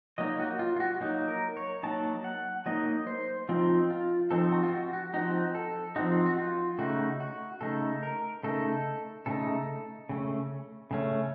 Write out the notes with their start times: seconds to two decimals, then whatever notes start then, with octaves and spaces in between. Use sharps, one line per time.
0.18 F#3 A#3 D#4 D#5
0.39 F#4
0.59 F4
0.76 F4
0.80 F#4
1.01 F#3 A#3 D#4
1.28 A#4
1.57 C#5
1.83 F#3 A#3 D#4 A5
2.24 F#5
2.66 F#3 A#3 D#4 D#5
3.07 C5
3.49 F3 C4 D#4 F4
3.91 F4
4.31 F3 C4 D#4 A4
4.52 F#4
4.63 F4
4.73 F#4
4.93 F#4
5.14 F3 C4 D#4 F#4
5.55 A4
5.96 F3 C4 D#4 F#4
6.26 F#4
6.38 F4
6.79 C#3 A3 D#4 F#4
7.20 F#4
7.61 C#3 A3 D#4 A4
8.03 A#4
8.43 C#3 A3 D#4 A4
9.26 C#3 A3 D#4 A4
10.09 C#3 A3 C#4
10.91 C#3 A3 C#4